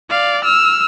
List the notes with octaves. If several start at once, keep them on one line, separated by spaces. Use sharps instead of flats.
D5 F5
E6 F6